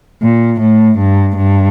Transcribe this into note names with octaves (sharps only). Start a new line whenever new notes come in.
A#2
A2
G2
G2